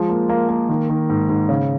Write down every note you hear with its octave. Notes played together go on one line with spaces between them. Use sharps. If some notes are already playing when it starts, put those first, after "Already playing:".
Already playing: F3 G#3
A#3
A#3
A#3
D#3
D#3
G#2
G#2
C#3